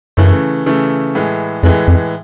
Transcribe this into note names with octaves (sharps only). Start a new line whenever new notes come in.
F#2 C#3 E3 A3
C#3 E3 A3
A2 E3 G#3
F2 A2 E3 G#3
F2